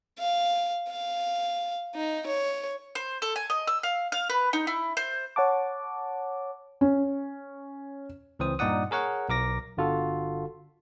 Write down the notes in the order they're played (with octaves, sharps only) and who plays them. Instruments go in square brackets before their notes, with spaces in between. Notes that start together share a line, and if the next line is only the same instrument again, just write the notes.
[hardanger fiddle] F5
F5
D#4
C#5
[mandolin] C5
A4
G#5
D#5
E6
F5
F5
B4
D#4
E4
C5
[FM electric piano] C#5 F#5 A5 D6
[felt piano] C#4
[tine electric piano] C#2 E3 C4 C5 D#6
G2 A#2 D#4 D5 F#5 D#6
G#4 A#4 C#5 F#5
B1 A#4 D6 A#6
G1 D3 F4 F#4 A4